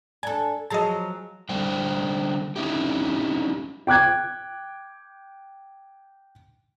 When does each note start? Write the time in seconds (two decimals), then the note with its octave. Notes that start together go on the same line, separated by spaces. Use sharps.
0.23 D4 A4 G#5
0.70 F3 F#3 G#4 D#5 A5
1.49 D3 G3 C5 G5
2.56 C#4 D#4 E4 G4
3.87 G5 D6 F#6 G#6